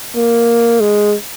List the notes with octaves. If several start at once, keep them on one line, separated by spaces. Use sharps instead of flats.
A#3
G#3